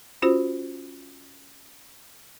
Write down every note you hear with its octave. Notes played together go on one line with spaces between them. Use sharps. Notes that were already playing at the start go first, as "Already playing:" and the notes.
C#4 F4 F#4 C5